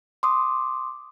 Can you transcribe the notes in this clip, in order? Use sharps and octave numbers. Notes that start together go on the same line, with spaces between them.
C6 D6 D#6